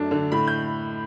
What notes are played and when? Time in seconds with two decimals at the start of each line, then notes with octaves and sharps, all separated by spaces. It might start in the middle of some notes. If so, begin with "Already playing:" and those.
Already playing: F#2 A3 D4 A5
0.11 D3
0.32 A2 B5
0.48 G6